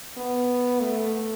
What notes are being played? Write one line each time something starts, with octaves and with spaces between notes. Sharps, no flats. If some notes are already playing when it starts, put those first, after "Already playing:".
B3
A3